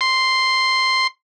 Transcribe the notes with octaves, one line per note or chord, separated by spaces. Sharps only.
C6